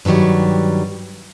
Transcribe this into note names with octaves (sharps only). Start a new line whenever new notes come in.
G2 D3 D#3 F#3 G3